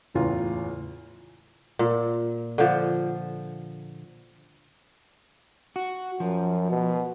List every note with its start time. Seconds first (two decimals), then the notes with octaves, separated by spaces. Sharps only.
0.14 F#1 E2 A2 F4 A#5
1.79 A#2
2.58 D3 F3
5.76 F#4
6.20 F#2 F3
6.70 B2